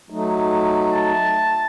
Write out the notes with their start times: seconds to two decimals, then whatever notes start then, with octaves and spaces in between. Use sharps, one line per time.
0.10 F#3 A3 D#4
0.92 A5